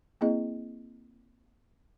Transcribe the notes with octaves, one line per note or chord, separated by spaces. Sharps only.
A#3 C4 E4 G#4 D#5